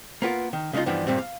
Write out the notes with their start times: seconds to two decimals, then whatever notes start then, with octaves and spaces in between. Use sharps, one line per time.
0.22 A#3 B3 F4 A#4
0.53 D#3
0.73 C#3 G#3 D4 D#4 F4
0.86 G2 E3 F3 B3 D4 D#4
1.07 G2 A#2 G3 C4
1.18 F5